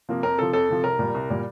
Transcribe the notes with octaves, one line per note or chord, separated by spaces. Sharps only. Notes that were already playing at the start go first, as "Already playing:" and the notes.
C3 F3 A#3
F2 A#4
C3 F3 A4
F2 A4
C3 F3
C2 A#4
A#2 G3
C2
A#2 G3